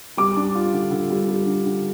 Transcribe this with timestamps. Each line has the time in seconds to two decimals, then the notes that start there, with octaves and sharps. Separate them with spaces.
0.17 G3 D6
0.37 D4
0.55 F4
0.73 D3
0.91 D3
1.10 G3
1.28 G3
1.46 D3
1.65 D3